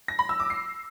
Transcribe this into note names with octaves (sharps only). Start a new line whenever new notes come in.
A#6
B5
E6
D6
C7